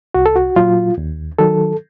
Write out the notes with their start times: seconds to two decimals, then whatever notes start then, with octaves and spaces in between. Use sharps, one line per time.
0.14 C2 F#4
0.26 A4
0.36 F#4
0.56 A#2 F#3 F4
0.98 D#2
1.39 D#3 F#3 A4